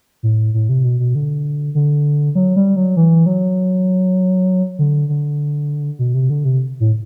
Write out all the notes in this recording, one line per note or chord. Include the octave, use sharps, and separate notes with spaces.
A2
A2
C3
B2
B2
D3
D3
F#3
G3
F#3
E3
F#3
D3
D3
B2
C3
D3
C3
A2